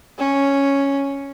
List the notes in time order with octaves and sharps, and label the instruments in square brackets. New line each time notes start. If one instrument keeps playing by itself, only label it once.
[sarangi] C#4